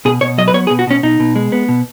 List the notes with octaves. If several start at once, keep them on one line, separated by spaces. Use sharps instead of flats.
B2 G#4
B2 C#5
F#3 D#5
B4
B3 C#5
G#4
B2
F#4
B2 C#4
B2 D#4
B2
G#3
B3
B2